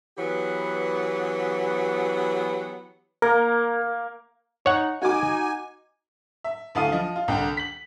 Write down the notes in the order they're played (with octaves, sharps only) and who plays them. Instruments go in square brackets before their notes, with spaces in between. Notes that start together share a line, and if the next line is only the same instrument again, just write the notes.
[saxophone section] E3 F#3 B3 G4
[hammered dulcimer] A#3 [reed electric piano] A#4
[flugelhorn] D#4 [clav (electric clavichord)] C#5 F#5
[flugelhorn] D#4 [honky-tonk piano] F#4 D6 [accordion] G#5
[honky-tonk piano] E5
D2 E4 A4 F5 D#6 D#7
F3 D#5
F4
C2 D3 G5
B6 F#7